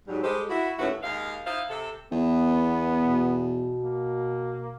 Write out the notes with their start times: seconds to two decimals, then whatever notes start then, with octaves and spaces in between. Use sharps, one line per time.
0.08 G#2 F#3 G3
0.23 G3 G#3 G4 A4 C5
0.49 E4 F#4
0.79 D#2 A2 C#4 F#4 B4 E5
1.03 D#2 G#3 F5
1.46 D#4 E4 C5 F5
1.69 C3 A4
2.12 E2 B3
3.01 B2
3.83 A#3